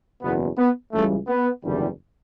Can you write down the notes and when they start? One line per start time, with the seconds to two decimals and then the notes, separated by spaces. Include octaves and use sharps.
0.22 F#1 E2 B2 B3
0.58 B3
0.92 C#2 C#3 E3 G3 A3
1.28 B3
1.63 F#1 E2 D3 G3